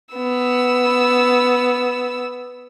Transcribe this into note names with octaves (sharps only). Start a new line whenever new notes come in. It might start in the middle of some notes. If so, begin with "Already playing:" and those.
B3 E6